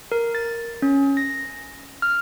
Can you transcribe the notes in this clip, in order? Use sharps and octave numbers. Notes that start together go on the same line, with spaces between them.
A#4
A6
C#4
A#6
F6